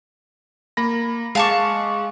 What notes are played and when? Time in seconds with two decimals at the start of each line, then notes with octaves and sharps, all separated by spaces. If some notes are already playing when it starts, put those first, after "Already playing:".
0.77 A#3 B5 A#6
1.35 G#3 F5 A5 C#6 D6